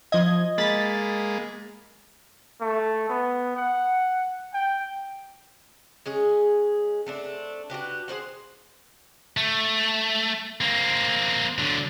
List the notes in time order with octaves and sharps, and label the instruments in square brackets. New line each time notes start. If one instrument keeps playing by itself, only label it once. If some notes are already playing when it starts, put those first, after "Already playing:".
[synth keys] F3 G#6 [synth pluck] D#5
[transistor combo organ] G#3 A#3 [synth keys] B5 A6 B6
[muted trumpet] A3
B3
F#5
G5
[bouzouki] G#3 C#4 G#4
A3 C4 D4
D4 F#4 G4 B4
G#4 B4 C5 F#5
[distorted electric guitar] A3
A#3 C4
D3 F#3